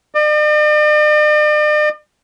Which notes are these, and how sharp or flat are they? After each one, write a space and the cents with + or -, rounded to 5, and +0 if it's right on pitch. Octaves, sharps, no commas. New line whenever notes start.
D5 +45